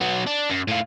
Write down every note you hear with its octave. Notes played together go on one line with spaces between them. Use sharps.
F#3 B3
D4
F#2
A2 F4